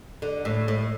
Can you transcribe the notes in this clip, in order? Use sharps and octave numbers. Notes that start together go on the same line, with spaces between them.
D3
A2
A2